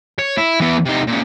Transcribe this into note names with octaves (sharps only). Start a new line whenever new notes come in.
C#5
E4
E3 B3
C3 D#4
A#2 C#3